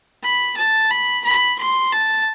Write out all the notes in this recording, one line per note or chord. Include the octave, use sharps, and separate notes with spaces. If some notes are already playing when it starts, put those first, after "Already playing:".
B5
A5
B5
B5
C6
A5